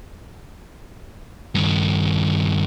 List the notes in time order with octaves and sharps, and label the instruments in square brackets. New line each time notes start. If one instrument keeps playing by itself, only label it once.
[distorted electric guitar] G2 D#3